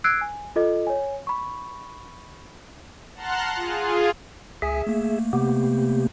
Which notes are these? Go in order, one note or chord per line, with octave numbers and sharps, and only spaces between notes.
E6 F#6 G#6 C7 D7
G#5
F4 A4 D#5
C#5 G#5
B5 C#6
F#5 A5 A#5 C6 F6 F#6
F4 G#4
C#2 G#4 E5 G#5
A3 A#3
C3 B3 G4